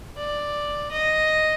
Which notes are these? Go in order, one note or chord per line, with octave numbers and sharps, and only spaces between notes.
D5
D#5